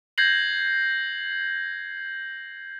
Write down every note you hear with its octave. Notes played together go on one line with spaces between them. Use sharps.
G6 G#6 A#6 C7 F#7